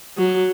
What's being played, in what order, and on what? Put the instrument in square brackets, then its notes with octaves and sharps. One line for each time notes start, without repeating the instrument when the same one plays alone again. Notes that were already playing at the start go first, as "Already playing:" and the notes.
[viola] F#3